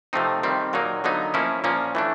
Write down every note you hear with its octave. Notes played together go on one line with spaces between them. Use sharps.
C3 F3 A3 C4 D#4
D#3 G3 C4
A#2 F#3 A#3 D#4
D3 F#3 B3 D#4
F3 A#3 C#4 E4
A#2 F3 A#3 C#4
E3 A3 D4